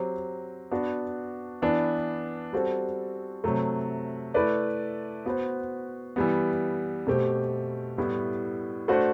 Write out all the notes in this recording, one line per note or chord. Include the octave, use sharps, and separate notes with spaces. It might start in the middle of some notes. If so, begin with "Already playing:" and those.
Already playing: F#3 C4 G4
B3 D4 F#4
E3 B3 D4
G3 C4 F#4 A4
C3 F#3 A3
A3 E4 B4 D5
B3 F#4 C5
E3 G3 B3
B2 A3 C4 G4
A2 G3 B3 E4
A3 D4 F#4 C5